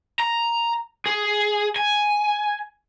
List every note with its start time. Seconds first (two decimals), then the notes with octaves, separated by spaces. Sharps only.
0.19 A#5
1.06 G#4
1.76 G#5